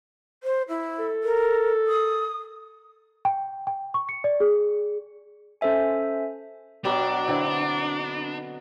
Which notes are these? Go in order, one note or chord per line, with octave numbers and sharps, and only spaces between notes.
C5
E4
A4
A#4
D#6
G5
G5
C#6
C#7
D5
G#4
C#4 A4 C5 E5 G#5
B2 F#3 B3 D4 G4 D6
D3 C4 E4